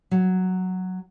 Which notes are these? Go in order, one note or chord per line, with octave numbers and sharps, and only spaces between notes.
F#3